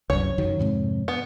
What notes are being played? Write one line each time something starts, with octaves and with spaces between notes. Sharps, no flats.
C2 F#2 C#5
F#2 D#3 F#3
F2 G#2 C3
B3